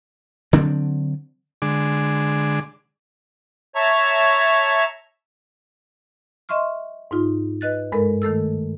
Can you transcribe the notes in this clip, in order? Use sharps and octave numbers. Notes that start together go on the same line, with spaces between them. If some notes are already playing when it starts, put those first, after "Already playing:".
D3 F#3 C4 D4
D3 G#3 D6
C#5 E5 A5 A#5 C#6
D#5 E5 C6 C#6 F6
G#2 D#4 F4
B4 D#5 F#6 A6
G2 G#3 A4 A#4
D#3 A3 A4 E6